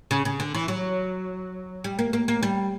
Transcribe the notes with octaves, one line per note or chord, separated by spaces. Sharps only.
C#3
C#3
D3
E3
F#3
G3
A#3
A#3
A#3
G3